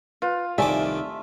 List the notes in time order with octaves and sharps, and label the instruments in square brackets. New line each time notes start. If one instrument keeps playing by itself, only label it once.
[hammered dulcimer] F4 [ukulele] B4
[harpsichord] C2 D#3 D6 [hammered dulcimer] A3 [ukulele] D5 G#5 [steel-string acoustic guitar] E5